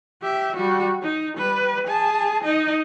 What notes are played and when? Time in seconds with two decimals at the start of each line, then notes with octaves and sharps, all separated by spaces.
0.22 G4 E5
0.55 G3 F#4
1.02 D#4
1.37 G3 B4
1.87 G#4 A5
2.44 D#4 D#5